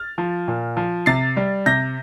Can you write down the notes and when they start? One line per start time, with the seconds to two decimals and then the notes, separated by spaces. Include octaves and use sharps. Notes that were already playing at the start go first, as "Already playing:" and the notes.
Already playing: F6 A6
0.18 F3
0.48 A#2
0.77 F3
1.06 C3 A6 C7
1.37 G3
1.66 C3 G6 A#6